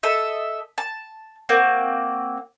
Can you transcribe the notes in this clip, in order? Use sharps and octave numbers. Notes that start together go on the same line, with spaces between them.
A4 D#5 E5
A5
A#3 C4 F#4